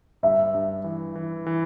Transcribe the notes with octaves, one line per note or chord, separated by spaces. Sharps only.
G2 E5
G2
E3
E3
E3